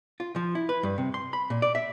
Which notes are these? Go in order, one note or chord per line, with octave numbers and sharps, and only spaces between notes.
F4
F3
E4
B4
G2
C3
C6
B5
A#2
D5
E5